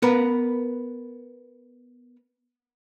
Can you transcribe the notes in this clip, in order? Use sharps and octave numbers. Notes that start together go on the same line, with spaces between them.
B3 A#4 B4